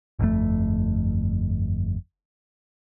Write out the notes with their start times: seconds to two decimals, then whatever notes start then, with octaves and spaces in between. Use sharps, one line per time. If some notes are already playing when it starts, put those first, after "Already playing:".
0.19 G1 F2 C#3 A3